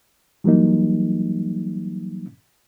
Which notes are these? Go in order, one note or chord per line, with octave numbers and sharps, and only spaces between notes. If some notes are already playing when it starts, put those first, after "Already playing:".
E3 F#3 G3 A#3 D#4